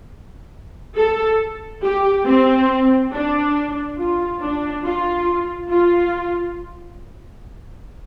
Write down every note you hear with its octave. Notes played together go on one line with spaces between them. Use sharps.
A4
G4
C4
D4
F4
D4
F4
F4